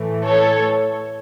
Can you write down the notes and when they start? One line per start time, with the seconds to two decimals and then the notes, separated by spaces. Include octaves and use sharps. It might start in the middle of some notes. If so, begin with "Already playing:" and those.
Already playing: A2 E3 A3
0.25 A4 C#5